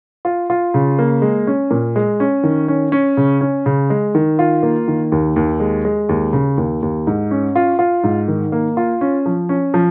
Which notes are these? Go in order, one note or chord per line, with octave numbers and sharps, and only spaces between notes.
F4
F4
C#3
A#3
G#3
C#4
A#2
G#3
C#4
D#3
C#4
C#4
C#3
C#4
C#3
G#3
D#3
F4
A#3
D#3
D#2
D#2
G#3
G#3
D#2
C#3
D#2
D#2
G#2
C#4
F4
F4
G#2
D#3
A#3
F4
C#4
F3
C#4
F3